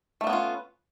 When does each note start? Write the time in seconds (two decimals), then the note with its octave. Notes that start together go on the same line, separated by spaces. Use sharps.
0.21 A3
0.24 G3
0.27 B3
0.30 C#4
0.33 F4